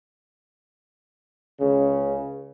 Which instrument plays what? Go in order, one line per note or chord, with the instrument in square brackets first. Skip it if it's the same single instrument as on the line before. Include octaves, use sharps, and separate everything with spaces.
[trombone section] C#2 C#3